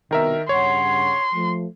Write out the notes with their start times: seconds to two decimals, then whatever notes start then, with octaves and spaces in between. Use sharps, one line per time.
0.11 C2 B2 D#3 A#4 E5
0.49 G2 C#3 C#5 F#5 C6
1.34 F3 A3